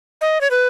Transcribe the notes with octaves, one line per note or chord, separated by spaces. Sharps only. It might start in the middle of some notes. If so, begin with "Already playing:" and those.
D#5
C#5
B4